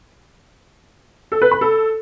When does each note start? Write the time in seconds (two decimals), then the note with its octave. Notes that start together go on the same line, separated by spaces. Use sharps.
1.32 A4
1.42 B4
1.51 B5
1.61 A4